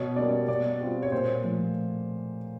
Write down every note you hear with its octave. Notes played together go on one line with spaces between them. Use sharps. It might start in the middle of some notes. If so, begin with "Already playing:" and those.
Already playing: B2 C#5
G3 A#3 C#4 D5
B2 D5
G3 C4 F4
C#5
A#2 C5
F3 A3